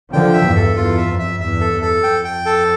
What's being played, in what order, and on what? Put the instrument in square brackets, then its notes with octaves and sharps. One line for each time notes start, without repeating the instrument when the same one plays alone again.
[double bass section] D3 F3 [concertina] G5
[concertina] E5
[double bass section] E2 G2
[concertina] A4
[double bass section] E2 [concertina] F4
[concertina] E5
[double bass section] F2
[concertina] E5
[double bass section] E2 G2 [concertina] E5
[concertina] A4
[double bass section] E2
[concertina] A4
[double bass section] F2 [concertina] G5
[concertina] G5
A4